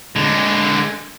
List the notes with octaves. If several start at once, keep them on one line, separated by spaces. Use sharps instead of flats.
D3 G#3